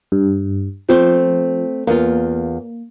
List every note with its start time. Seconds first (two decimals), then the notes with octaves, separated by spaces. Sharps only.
0.12 G2
0.89 F3 A3 C4 C5
1.87 E2 A#3 F4